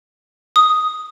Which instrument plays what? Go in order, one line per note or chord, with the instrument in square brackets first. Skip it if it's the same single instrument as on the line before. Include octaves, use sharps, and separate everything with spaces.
[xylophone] D#6